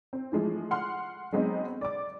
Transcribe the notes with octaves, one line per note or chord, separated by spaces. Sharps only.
C4
E3 F3 G#3 A3
F#5 C6 F6
F#3 G#3 B3 C4 D#4
D5 D6